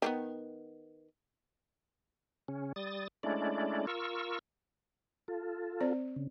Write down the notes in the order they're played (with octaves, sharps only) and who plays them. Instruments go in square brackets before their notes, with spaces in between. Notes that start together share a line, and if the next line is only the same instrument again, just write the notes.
[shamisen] D#3 A#3 B3
[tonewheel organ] C#3 C#4
G3 D#6 A6
G#3 A3 C#4 D4 E4 D5
F4 A#4 C#6 E6
F4 A4
[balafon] C4 C5 D5
[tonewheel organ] C#3